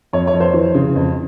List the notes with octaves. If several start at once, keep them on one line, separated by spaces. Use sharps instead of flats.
F2 C#5
C#5
F2
C5
E3
C#3
F2